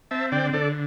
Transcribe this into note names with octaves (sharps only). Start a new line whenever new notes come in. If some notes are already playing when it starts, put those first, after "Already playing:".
C4 E5 A5
D3 D5 G5
D3 A4 D5